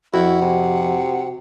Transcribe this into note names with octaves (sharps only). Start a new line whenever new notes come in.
F2 E4 F#4 F#5
C3